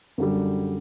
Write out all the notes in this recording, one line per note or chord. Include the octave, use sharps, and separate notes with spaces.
F#2 D3 G3